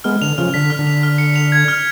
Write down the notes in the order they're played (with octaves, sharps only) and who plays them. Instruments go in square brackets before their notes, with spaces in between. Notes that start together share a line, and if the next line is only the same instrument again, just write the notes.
[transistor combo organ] G#3 B3 [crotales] F6
[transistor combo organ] D3 [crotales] F7
[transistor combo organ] C#3 F3 [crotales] F6
[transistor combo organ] D3 [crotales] B6
[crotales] F6
[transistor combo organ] D3
[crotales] F7
F6
C#7
F7
G#6
F6